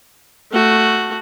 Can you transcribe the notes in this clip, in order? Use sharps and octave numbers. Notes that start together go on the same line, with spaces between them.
A3 F#4